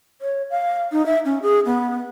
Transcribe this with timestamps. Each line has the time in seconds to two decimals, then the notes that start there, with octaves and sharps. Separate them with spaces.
0.22 C#5
0.50 F5
0.92 D#4
1.06 E5
1.25 C#4
1.42 G#4
1.66 B3